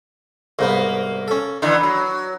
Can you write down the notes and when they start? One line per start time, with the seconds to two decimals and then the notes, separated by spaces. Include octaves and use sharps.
0.59 C2 G#2 A#3 B3
1.28 C#4 A4
1.62 D3 E3 B3 D#4
1.83 F#3